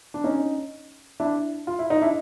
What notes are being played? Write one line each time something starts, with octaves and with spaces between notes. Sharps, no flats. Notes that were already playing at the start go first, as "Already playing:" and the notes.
D4
C#4 D#4
D4 E4
F4
E4
D#4
D4 E4